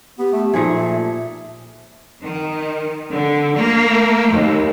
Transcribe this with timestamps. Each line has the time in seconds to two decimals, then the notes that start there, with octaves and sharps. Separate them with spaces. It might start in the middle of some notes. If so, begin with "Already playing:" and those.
0.19 B3 G4
0.33 A3
0.54 A#2 F3 A3 D#4 G#4
0.76 E5
2.23 D#3
3.12 D3
3.56 A#3
4.32 D#2